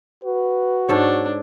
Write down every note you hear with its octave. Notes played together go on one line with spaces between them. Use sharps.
F#4 B4
G#2 D4 A4 C#5